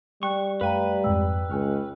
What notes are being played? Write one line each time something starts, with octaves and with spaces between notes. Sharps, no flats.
G3 G5 C#6 F#6
F#2 A3 B4 F5 G5 A#5 D#7
F2 G#2 G#3 G5 E6
C#2 G#5 C#6 F6